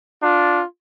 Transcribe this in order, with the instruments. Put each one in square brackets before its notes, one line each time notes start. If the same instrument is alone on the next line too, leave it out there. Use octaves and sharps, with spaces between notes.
[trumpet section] D4 F4